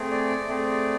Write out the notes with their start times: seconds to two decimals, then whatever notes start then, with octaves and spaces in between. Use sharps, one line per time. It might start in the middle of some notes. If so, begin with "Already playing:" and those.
Already playing: A3 C4 G#4
0.11 D5
0.48 A3 C4 G#4